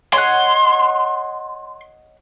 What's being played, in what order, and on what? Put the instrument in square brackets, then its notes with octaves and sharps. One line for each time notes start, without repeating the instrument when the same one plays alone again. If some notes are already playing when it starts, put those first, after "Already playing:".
[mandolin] C#5 D#5 F#5 [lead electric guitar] C6